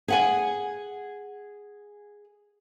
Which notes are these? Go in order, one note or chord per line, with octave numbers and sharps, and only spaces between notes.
G#4 F#5 G#5